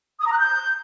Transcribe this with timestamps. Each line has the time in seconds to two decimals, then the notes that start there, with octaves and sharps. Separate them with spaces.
0.20 D#6
0.26 A#5
0.32 F#6
0.38 G6